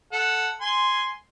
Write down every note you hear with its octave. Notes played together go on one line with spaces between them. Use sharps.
A4 F#5
G#5 C6